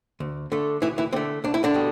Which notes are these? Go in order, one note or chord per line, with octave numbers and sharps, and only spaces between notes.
D2
D3 A3
D2 E3 E4
E3 E4
D3 A3 C4
C2 D4
E4
D3 D4
B2 G3